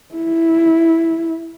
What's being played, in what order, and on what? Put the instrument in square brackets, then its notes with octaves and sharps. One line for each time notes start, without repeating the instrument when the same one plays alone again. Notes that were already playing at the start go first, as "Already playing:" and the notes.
[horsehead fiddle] E4